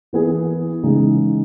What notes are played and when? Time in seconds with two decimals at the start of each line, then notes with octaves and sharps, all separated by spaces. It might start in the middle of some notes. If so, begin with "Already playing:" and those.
0.13 E3 B3 E4 G#4
0.83 C#3 E3 G#3 D#4 G#4